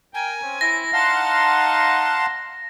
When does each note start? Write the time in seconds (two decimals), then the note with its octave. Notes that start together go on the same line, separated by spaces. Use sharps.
0.14 A#4 G5 G#5
0.42 C4 C#4
0.61 E4 A#6
0.93 D#4 F5 F#5 A5 C6